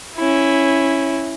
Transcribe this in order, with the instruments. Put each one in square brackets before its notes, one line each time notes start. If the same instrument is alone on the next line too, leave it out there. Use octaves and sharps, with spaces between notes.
[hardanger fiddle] C#4 E4